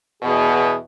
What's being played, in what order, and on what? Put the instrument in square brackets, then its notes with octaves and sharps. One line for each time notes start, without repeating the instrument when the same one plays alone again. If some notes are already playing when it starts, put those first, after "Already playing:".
[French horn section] E2 B2 [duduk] G#4